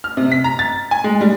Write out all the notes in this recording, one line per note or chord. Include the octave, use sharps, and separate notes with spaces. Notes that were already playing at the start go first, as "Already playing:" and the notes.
F6
C3
B6
A#5
A6
G#5
G#3
G3